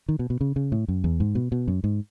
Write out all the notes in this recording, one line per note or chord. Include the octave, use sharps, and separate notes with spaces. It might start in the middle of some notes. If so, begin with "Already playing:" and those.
D#3
B2
B2
C#3
C#3
A2
F#2
E2
G#2
B2
B2
F#2
G#2